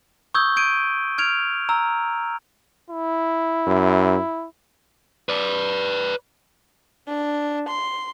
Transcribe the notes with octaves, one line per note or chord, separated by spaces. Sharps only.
C#6 D#6 E6 G6 G#6 G7
G6 G#6 D7 D#7
F6 G#6 D7 F7
A#5 E6
E4
F#2
B4 D5
D4
C6